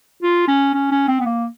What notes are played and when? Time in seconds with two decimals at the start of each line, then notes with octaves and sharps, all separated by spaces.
0.23 F4
0.48 C#4
0.74 C#4
0.91 C#4
1.08 C4
1.21 B3
1.26 A#3